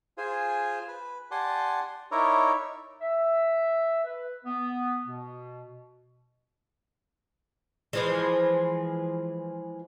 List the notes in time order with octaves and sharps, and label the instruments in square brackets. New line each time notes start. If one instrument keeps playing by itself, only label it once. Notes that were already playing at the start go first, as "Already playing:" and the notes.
[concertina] F4 G#4 C5 G#5
B4
G4 D5 F#5 G#5 A5 C6
D#4 E4 A#4 C#5 D5 E5
[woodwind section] E5
B4
B3
B2
[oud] E3 F3 G#3